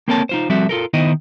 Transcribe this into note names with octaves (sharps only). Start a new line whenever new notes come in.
A#3 C4 A4 A#4 C#5 A5
D#4 F4 C5
F3 G3 C4 F#4 A4 E5
F4 A4 A#4
D#3 B3 D#4 E4 C5 D#5